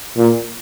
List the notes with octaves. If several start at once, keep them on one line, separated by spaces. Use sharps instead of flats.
A#2